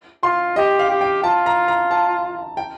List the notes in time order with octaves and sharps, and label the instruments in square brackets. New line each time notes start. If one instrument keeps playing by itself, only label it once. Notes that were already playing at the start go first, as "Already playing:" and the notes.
[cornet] F4 [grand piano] C6
[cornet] G4 [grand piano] D#5
[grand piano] F5
[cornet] G4
[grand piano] G5
[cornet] F4 [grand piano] A5
[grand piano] A#5
A#5
A5
G5